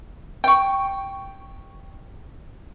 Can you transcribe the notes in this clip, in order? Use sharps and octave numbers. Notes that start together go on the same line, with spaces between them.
G5 C#6